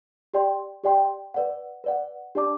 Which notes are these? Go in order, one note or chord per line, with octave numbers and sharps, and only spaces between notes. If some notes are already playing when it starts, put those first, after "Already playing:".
G4 D5 G5 C6
G4 D5 G5 C6
B4 D5 F#5
B4 D5 F#5
D4 G4 D5 A5 D6